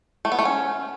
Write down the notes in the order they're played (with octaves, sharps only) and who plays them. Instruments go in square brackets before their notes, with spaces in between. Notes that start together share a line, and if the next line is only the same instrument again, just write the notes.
[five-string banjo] A3
B3
A3
C#4